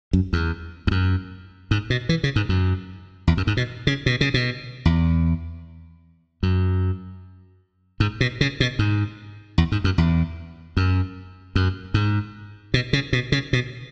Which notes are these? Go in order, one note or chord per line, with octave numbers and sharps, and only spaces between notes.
F#2
E2
E2
F#2
G#2
B2
E3
C#3
G#2
F#2
E2
F#2
G#2
B2
C#3
B2
C#3
B2
E2
F#2
G#2
B2
C#3
B2
G#2
E2
G#2
F#2
E2
F#2
F#2
G#2
B2
C#3
B2
C#3
B2